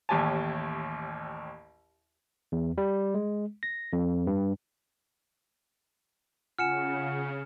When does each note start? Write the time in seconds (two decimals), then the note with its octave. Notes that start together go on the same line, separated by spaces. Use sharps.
0.09 A1 D#2 G4 C#5 G#5 A5
2.52 E2
2.78 G3
3.14 G#3
3.63 A#6
3.93 F2
4.27 G2
6.58 C#3 F4 F#5 G#5 F6 C#7 E7